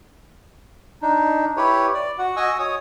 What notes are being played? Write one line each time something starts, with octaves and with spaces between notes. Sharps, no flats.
D4 D#4
E4 G4 B4 C#5
D5
F#4 F#5
F#4 D#5 G#5 C#6 D#6 E6
C#5 D#6